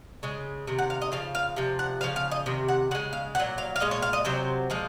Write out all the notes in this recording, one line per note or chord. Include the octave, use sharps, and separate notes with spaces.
C#3 G#3
C3 D#3
F#5
F5
D#5
C#3 F3 F5
F5
C3 F3
F#5
C#3 F3 F5
F5
D#5
C3 D#3
F#5
C#3 G#3 F#5
F5
A#2 F#3 F#5
F5
F5
A#2 G#3 D#5
C#5
F5
D#5
C3 F#3 C5
A#2 F3 G#3